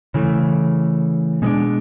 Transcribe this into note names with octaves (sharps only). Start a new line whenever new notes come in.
C#3 E3 A3
B2 G#3 B3 D4